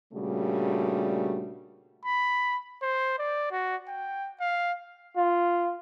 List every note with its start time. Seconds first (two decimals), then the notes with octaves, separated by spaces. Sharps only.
0.14 A#2 C#3 G3 A3 D4 F#4
2.05 B5
2.82 C5
3.19 D5
3.52 F#4
3.88 G5
4.40 F5
5.16 F4